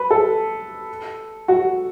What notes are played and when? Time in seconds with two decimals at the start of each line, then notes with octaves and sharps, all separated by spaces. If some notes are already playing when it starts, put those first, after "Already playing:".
Already playing: B4
0.11 A4
1.48 F#4